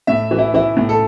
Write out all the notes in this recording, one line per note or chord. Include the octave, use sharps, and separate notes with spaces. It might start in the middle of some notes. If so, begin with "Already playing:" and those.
A2 E5
E3
E4
E3 E4
A2
A4